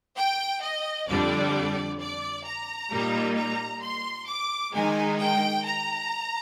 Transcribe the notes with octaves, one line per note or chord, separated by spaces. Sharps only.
G5
D#5
F2 D3 G3 D4 D5
D5
A#5
A#2 G3 A#3 D#4
A#5
C6
D6
D#3 G#3 D#4 G#5
G5
A#5